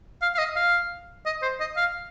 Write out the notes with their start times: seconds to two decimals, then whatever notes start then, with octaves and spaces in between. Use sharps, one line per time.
0.22 F5
0.35 F5
0.39 D#5
0.56 F5
1.26 D#5
1.42 C5
1.60 D#5
1.77 F5